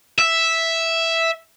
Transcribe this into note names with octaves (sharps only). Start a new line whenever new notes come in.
E5